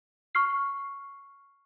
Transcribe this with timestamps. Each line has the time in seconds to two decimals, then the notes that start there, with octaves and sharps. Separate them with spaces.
0.35 C#6 F6 C7